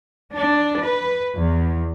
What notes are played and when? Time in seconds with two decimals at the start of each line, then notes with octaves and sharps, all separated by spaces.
0.33 D4
0.80 B4
1.35 E2